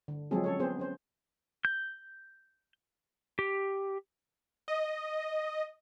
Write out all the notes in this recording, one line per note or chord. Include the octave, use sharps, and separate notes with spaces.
D3
F3 F#3 G#3 C4 G#4 A4
C#4 A4 C#5
B3 C4 G#4 C5
C#4 C5
G6
G4
D#5